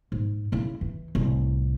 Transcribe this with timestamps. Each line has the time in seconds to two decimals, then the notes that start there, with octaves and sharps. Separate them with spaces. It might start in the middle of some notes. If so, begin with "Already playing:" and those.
0.12 G#2
0.52 C#3 E4
0.81 E3
1.15 C2 A2